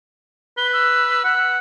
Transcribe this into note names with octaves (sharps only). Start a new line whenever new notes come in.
B4 G7
E6
F#5